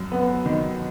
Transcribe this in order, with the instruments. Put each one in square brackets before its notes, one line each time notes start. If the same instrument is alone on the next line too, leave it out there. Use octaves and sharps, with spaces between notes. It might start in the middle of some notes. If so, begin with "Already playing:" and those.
Already playing: [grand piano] F#2
B3
D#3